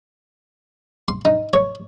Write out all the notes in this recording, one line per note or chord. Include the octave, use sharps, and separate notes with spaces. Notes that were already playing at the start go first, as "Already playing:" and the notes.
C6
D#4
C#5